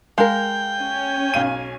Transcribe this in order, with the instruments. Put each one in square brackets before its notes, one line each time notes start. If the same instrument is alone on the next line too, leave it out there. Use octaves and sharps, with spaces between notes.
[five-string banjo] G#3 A#4 [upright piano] F5 [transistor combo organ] G5
[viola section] C#4 G#5
[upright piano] B1 F5 D#7